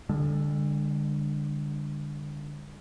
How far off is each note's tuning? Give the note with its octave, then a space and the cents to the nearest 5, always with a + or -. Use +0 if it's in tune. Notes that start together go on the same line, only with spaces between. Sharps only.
D3 +0 G#3 -45